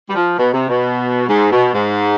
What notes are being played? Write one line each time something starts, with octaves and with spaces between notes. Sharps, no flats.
G3
F3
B2
C3
B2
G#2
B2
G#2